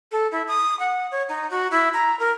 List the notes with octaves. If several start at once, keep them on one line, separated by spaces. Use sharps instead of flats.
A4
E4
D#6
F#5
C#5
D#4
F#4
E4
A#5
A#4